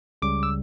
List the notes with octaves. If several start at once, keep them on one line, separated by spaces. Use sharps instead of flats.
C#2 C#3 G3 D6
E6